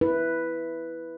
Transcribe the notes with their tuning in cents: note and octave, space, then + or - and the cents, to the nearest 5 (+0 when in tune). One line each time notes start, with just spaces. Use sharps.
E4 +0 B4 +0